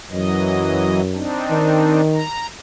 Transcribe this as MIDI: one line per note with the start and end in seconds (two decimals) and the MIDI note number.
0.11 1.28 42
0.11 1.01 52
0.11 1.01 54
0.11 1.01 75
1.14 2.01 60
1.14 2.01 62
1.14 2.01 63
1.51 2.22 51
2.13 2.46 82